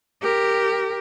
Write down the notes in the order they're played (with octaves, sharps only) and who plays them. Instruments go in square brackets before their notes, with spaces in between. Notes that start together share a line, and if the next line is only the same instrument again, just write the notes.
[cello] G4 A#4